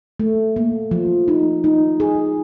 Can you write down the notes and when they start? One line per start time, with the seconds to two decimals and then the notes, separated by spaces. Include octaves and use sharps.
0.20 A3
0.56 A#3
0.91 F3
1.28 D#4
1.64 D#4
2.00 G#4